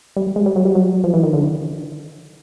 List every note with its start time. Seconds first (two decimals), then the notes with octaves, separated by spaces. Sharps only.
0.17 G3
0.36 G#3
0.46 G3
0.56 F#3
0.65 G3
0.75 F#3
1.04 F3
1.14 E3
1.23 D#3
1.33 D3